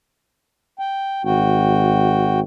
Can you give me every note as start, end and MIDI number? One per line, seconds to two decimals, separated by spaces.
0.79 1.22 79
1.25 2.43 32
1.25 2.40 66
1.25 2.40 79